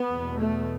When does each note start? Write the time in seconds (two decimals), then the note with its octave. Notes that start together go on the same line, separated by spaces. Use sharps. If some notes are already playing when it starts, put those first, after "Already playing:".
Already playing: B3
0.09 E2 B2
0.37 A3